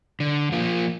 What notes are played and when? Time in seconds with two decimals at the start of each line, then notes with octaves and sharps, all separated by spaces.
0.20 D3
0.52 F3 A#3 F4